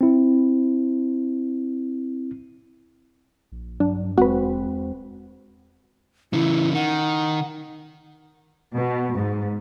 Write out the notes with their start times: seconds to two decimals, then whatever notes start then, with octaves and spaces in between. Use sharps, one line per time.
0.01 C4 E4
3.52 A#1
3.80 G2 F#3 D4
4.18 D#1 E2 G#3 C4 F#4 B4
6.33 C#3 E3 E4
6.74 D#3 F#5
8.75 B2
9.14 G#2